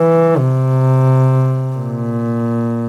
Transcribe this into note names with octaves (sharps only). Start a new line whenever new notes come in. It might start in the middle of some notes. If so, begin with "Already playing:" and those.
Already playing: E3
C3
A#2